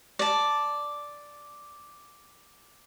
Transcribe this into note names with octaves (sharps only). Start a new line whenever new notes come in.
D5 A5